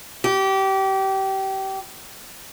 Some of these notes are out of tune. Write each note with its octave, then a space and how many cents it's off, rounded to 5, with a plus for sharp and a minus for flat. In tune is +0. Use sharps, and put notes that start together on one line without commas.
G4 -25